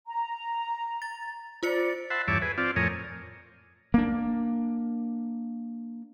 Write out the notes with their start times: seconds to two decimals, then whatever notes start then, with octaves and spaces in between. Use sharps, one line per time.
0.07 A#5
1.02 A6
1.63 F4 C5 D5 C#7
2.10 E5 F#5 A5 B5 C6
2.28 E2 G2 C#5 E5 A5 D6
2.42 G#4 B4
2.58 C4 F4 D5
2.76 F2 A2 A#4 C#5 G#5 D#6
3.94 A#3 D4